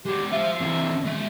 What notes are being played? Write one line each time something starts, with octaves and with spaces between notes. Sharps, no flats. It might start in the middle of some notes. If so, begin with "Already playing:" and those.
G#3 F#4 G4
F4 C5 E5
E3 C4
G#3 E5